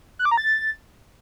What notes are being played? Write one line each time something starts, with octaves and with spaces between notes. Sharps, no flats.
F#6
D6
A#5
A6